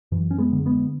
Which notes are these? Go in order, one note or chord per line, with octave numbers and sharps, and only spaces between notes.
F#2 E3
C#4
G#3 B3
D3
G#3 B3